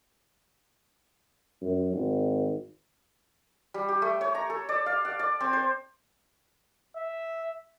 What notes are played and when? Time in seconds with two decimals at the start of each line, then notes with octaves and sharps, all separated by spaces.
1.61 F#2
1.94 G#1
3.74 G3
3.89 G4
4.02 A3
4.21 C#5
4.35 A#5
4.50 A4
4.69 D5
4.86 F5
5.05 F#5
5.19 D5
5.40 C4
5.53 C5
6.96 E5